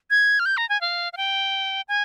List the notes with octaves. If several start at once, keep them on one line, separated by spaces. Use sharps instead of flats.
G#6
F6
G6
A#5
G#5
F5
F5
G5
G#5